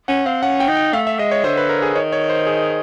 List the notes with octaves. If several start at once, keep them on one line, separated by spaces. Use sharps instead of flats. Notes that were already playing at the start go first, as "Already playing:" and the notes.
C#4 F#5
C4 F5
C#4 F#5
G5
D#4
G5
A3 F5
E5
G#3 D#5
C#5
D3 C5
B4
A#4
G#4
D#3 C#5
C#5
C5
G#4